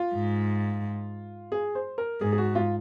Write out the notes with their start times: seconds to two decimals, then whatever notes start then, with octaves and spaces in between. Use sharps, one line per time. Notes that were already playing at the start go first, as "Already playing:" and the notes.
Already playing: F4
0.14 G#2
1.52 G#4
1.75 C5
1.98 A#4
2.21 G#2 G#4
2.32 G#4
2.38 F#4
2.55 F4